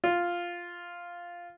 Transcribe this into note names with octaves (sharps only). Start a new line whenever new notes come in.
F4